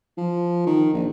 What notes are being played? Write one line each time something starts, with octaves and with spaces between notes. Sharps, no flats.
F3
D#3
A#1